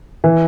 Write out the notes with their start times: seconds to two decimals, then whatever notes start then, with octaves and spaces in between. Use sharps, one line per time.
0.24 E3